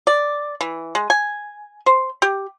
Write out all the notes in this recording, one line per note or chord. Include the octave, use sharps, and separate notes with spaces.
D5
E3
G#3
G#5
C5
G4